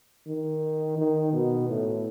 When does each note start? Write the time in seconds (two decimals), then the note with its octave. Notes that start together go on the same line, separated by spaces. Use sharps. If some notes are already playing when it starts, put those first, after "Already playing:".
0.28 D#3
0.98 D#3
1.33 B2
1.69 A2